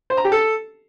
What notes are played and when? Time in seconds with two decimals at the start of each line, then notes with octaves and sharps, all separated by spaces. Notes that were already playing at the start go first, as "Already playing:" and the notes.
0.10 C5
0.17 A#5
0.25 G4
0.32 A4